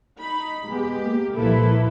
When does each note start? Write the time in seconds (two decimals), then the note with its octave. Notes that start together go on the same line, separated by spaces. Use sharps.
0.19 D#4 B5
0.67 G#3 B3 G4
1.02 A#3
1.36 C2 A#2 F3 A#3 E4 A4 B4